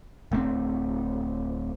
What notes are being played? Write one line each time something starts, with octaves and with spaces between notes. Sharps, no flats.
D1 A3 A#3 C4